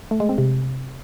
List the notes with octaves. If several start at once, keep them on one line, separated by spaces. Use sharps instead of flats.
A3
G#3
C4
C3